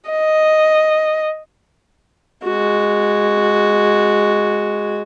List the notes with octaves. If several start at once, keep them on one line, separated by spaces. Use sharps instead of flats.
D#5
G#3 F#4